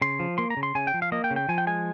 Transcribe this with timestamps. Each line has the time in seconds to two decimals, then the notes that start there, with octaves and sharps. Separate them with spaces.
0.01 C#3 C6
0.19 F3
0.38 A#3 C6
0.50 A#5
0.57 C#3
0.63 C6
0.75 C#3 G#5
0.87 G5
0.94 F3
1.02 F5
1.12 A#3 D#5
1.24 G5
1.31 C#3
1.36 G5
1.49 F3 G#5
1.58 G5
1.67 G#3 G#5